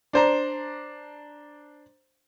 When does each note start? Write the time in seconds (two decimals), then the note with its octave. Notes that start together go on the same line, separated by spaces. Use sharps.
0.13 D4 C5 A#5